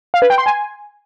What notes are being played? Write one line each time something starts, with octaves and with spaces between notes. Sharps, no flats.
F5
B4
G5
C6
G#5